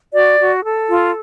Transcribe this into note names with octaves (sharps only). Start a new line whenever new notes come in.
F#4 D5
F#4
A4
F4